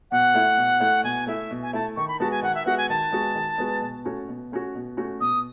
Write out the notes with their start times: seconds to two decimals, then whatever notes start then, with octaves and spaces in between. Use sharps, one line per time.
0.11 B2 F#5
0.34 A3 E4
0.57 B2
0.80 A3 E4
1.04 B2 G#5
1.27 A3 E4 E5
1.51 B2
1.62 G#5
1.73 A3 E4 A5
1.96 D#3 C#6
2.08 B5
2.20 G#3 B3 F#4 A5
2.31 G#5
2.42 D#3 F#5
2.55 E5
2.66 G#3 B3 F#4 F#5
2.78 G#5
2.89 D#3 A5
3.12 G#3 B3 F#4
3.35 D#3
3.58 G#3 B3 F#4
3.82 B2
4.05 A3 C#4 F#4
4.28 B2
4.52 A3 C#4 F#4
4.75 B2
4.97 A3 C#4 F#4
5.20 B2 D#6